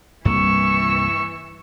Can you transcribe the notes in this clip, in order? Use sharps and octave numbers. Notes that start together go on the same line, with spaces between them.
C2 G2 E3 A#3 C#6 E6